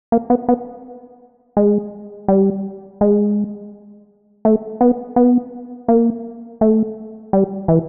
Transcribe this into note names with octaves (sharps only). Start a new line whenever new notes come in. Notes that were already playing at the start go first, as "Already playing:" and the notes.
A#3
B3
B3
G#3
G3
G#3
A3
B3
B3
A#3
A3
G3
E3